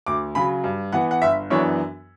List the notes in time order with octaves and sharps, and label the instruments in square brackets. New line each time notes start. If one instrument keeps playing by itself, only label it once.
[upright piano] D2 D6
C#3 F#3 B5
G2
E3 B3 F#5
F#5
G1 E5
F#2 E3 B3 D4 C#5